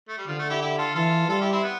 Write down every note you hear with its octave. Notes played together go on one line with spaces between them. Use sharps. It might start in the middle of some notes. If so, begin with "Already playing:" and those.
A3
G3
D3 F3
A3
E4 G4
E4 G4
F4 A4
E3 F4 A4
G3 F4 A4
E4 G4
C4 E4
B3